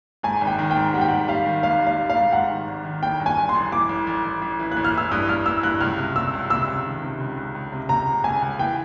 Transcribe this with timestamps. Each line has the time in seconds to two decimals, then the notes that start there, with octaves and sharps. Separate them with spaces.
0.23 G#2 G#5
0.41 G#1
0.47 G5
0.59 D#3
0.71 G5
0.76 G#2
0.94 G3 F#5
1.01 G5
1.08 G#2 F#5
1.28 G3 F5
1.46 D#3
1.63 G#1 F5
1.80 G3
1.86 F5
1.98 G3
2.10 F5
2.15 G#2
2.33 G#2 F#5
2.50 D#3
2.67 G#1
2.85 D#3
3.02 A1 G5
3.20 G2
3.26 G#5
3.37 G2
3.49 C6
3.55 A1
3.72 E3 D6
3.89 A1
4.07 A1
4.24 A1
4.42 A1
4.59 E3
4.72 A1 F#6
4.85 F6
4.94 E3 E6
5.11 G2 D#6
5.29 G2 F6
5.46 E3 E6
5.63 G2 F#6
5.81 C#2 F6
5.98 C3
6.16 C3 E6
6.33 C#2
6.50 C3 E6
6.68 C#2
6.86 D#3
7.03 C3
7.20 C#2
7.37 C#2
7.55 C#2
7.72 C3
7.89 C#2 A#5
8.07 C#2
8.24 C#2 G#5
8.42 C#2
8.59 E3 G5